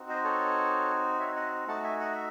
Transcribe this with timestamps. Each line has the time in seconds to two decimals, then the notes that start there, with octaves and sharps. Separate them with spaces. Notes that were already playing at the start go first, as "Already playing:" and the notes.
Already playing: C4 D#4 F#4
0.09 C5 D#5
0.24 A4 C#5
1.19 C#5 E5
1.36 D#5 F#5
1.67 A3 D#4 F#4 F#5 A5
1.83 E5 G#5
2.00 D#5 F#5
2.15 E5